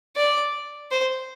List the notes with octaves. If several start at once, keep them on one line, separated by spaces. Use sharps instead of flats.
D5
C5